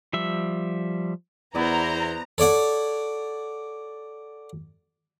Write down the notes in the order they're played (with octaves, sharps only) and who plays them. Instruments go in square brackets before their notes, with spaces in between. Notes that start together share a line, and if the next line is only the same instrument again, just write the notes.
[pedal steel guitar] F3 G3 E5
[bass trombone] E2 [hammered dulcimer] B3 D5 [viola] E4 C5 [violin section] A#5
[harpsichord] A4 C#5 D5 F#5